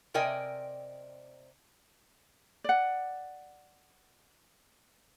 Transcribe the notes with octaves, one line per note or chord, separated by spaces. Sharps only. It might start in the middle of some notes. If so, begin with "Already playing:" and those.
C3 A#4 D5 D#5 G5 G#5
D5 F#5